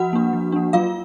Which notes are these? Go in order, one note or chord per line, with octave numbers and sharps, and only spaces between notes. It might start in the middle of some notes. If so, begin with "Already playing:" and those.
Already playing: F3 F#4 F#5
A#3 D4
F3
A#3 D4
F#3 F4 F5